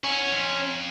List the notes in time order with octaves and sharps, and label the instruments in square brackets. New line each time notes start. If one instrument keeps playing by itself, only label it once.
[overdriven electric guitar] C#4 [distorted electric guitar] E4 F#5
[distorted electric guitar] F2